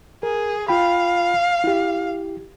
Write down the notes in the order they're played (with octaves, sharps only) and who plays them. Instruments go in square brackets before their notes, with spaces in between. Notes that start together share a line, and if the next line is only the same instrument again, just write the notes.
[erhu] G#4 [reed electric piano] A#4
[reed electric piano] F4 G5 B5 [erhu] F5
[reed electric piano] E4 G4